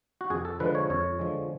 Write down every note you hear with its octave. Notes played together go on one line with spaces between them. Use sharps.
F#4
F2 G#4
A4
D3 F3 G#3 B4
C#5
F2 C#5
D3 F3 G#3